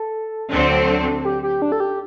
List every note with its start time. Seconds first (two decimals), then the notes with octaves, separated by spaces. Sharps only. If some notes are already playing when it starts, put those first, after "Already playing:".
Already playing: A4
0.51 D2 D3 F#3 C4
1.25 G4
1.43 G4
1.62 D4
1.72 A4
1.80 G4